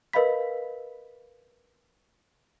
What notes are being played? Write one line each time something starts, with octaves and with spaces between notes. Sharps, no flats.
A#4 B4 D#5 F5 B5 B6